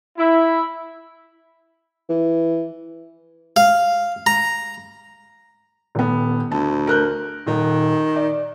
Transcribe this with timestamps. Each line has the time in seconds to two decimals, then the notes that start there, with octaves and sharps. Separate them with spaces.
0.18 E4
2.10 E3
3.56 F5
4.27 A#5
5.95 D#1 B3
6.52 D2 A5
6.87 A#4 F#6 G6
7.47 D#1 D#3
8.16 D5